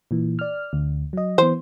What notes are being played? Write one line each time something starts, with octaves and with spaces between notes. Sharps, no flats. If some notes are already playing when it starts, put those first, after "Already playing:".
A#2 E3
D5 F6
D2
F#3 D#5
E3 B3 C5